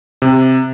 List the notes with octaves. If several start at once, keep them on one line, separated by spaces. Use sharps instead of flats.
C3